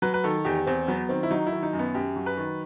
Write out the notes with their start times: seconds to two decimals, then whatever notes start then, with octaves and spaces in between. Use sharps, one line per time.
0.02 F#3 B4
0.14 B4
0.24 D#3 A4
0.45 E2 G4
0.67 E2 C4
0.88 F#3 B3
1.09 D#3 C4
1.23 E4
1.31 F#3 D#4
1.47 E4
1.52 D#3
1.63 D#4
1.73 F#2
1.79 B3
1.94 F#2 G4
2.16 F#3
2.26 B4
2.37 D#3